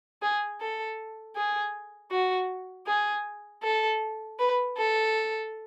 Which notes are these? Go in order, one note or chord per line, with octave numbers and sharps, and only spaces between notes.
G#4
A4
G#4
F#4
G#4
A4
B4
A4